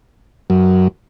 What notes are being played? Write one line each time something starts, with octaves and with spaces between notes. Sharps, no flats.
F#2